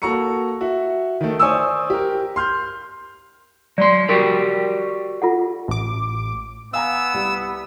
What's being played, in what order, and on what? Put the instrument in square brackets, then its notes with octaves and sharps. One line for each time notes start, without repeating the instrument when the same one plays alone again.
[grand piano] A#3 F#4 A4 A#5 C#6 C#7
F#4 E5
D#3 A3
C5 D5 G#5 C#6 D#6 E6
G4 A#4
C6 F6 G6
[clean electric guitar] F#3 C6 [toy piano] D5
[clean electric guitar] F#4 G4 D5 [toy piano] A#4
[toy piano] F4 A4 F#5
[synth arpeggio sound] A1 D6
[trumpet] B3 [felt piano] F5 G#5 A#5 [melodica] E6
[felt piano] C2